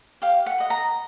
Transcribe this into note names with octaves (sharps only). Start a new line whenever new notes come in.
G4 F5
F#5
B4 D#5
A#5